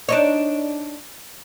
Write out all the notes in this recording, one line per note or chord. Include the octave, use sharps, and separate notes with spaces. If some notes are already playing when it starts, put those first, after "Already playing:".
D4 D#4 C#5